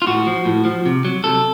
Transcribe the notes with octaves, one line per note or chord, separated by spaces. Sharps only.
F4
A2 F#4
F3
A2
F3
C3
F#3
C3 A4